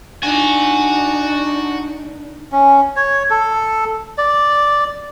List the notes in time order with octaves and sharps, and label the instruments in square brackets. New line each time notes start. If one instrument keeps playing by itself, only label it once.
[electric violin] D4 D#4 [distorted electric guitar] F#4 [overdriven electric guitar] D5 G#5
[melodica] C#4
C#5
A4
D5